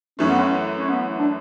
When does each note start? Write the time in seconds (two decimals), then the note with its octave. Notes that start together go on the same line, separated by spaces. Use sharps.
0.19 F#2 E3 A3 C#4
0.29 B3
0.39 C#4
0.78 C#4
0.89 B3
1.18 D4